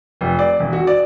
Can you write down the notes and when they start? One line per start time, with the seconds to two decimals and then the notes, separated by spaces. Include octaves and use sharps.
0.21 F1
0.39 D5
0.60 E1
0.73 F#4
0.87 D5